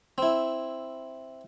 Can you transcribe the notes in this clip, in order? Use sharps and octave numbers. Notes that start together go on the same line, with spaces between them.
C4 E4